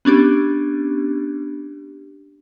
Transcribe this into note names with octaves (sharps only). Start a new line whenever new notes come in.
B3 C#4 D4 G4